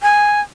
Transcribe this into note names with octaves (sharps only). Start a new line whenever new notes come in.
G#5